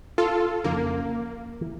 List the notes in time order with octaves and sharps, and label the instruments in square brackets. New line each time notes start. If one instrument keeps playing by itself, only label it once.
[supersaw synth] F4 A4
[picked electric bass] F2 C#3 F3 C#4 [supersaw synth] A#3
[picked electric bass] E3